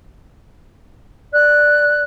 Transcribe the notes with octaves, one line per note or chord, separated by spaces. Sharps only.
D5 F#6